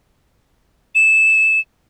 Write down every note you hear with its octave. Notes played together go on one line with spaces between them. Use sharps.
E7